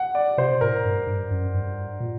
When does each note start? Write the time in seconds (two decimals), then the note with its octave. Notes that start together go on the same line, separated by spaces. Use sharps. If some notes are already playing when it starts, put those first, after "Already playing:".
Already playing: F#5
0.15 D5
0.38 C3 C5
0.61 A2 A#4
0.84 G2
1.07 G2
1.31 F#2
1.54 G2
2.00 A#2